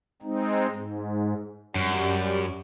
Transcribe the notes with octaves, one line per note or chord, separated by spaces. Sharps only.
G#3 C4 D#4
G#2
F#2 G3